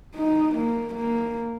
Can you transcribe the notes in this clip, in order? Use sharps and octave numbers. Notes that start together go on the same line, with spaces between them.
D#4
A#3
A#3